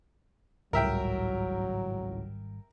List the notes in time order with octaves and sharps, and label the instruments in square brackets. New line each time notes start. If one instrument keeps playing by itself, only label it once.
[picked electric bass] G#1 G3 [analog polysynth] C#2 A2 [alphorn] F#3 [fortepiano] A#4 E5 G5